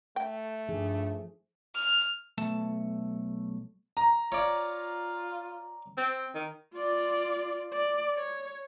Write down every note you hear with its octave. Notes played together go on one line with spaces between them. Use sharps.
A3 G5
G2 F3 D#4 G#4
F6
B1 A3 A5
A#5
F4 C#5 D5
C4
D#3
F4 D5
D5
C#5